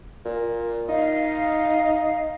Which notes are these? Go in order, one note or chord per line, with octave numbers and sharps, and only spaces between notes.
A#2
D#4 F5